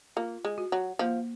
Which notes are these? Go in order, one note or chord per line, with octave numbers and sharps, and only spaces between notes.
A#3 F4
G#3
F#4
F#3
F3 A#3